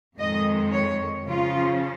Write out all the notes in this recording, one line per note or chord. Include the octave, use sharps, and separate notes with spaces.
F2 D#3 G#3 D#5
C#5
C#3 F3 C#4 F4